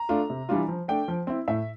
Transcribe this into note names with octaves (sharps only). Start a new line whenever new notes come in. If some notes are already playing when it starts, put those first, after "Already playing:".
Already playing: A#5
A3 D4 F4
C3
E3 G3 D4 F4
F3
A3 D4 G5
F3
C4 E4
A2 E5